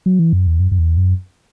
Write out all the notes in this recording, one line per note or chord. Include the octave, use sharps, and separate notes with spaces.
F#3
E3
F#2
E2
F#2
F#2
E2
F#2